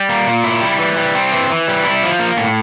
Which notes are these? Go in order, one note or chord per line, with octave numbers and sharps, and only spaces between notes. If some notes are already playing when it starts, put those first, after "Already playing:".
Already playing: G3
A#3
A#2
E4
G3
E3
G3
C4
E3
E3
G3
E4
F3
A#3
A2